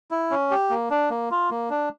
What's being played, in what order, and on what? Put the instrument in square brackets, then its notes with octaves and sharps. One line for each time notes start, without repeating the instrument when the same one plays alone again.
[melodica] E4
C#4
G4
A#3
D4
A#3
F4
A#3
D4